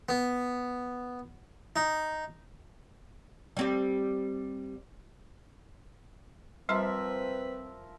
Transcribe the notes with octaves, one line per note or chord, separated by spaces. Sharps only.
B3
D#4
G3 C4 G4
F3 G3 C4 A#4 B4 E5 C6